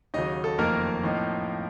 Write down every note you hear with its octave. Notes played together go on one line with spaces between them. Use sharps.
D#2 C#3 F#3 D#4 D#5
A4
F#1 F2 D#3 A3 A#3 D#4 A#4
A2 F3 C4 D#4